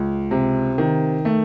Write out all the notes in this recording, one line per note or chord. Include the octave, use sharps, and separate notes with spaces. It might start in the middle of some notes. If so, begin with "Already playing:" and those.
Already playing: C#2
C3
D#3
A3